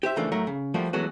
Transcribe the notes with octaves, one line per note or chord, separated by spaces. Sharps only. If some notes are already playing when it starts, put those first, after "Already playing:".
G4 C5 E5
C#3 E3 F3 A3 A#3 D4
A2 F#3 A3 A#4
C#3
F3 G3 A3 A#3 F#4
E3 F#3 G#3 A3 B3 F#4